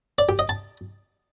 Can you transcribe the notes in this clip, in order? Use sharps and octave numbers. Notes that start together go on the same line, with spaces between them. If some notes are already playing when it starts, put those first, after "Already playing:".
D5
G4
D#5
A5